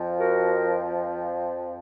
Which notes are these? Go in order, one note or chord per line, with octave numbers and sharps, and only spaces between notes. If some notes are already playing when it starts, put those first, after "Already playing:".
Already playing: F2 F3
F#4 A#4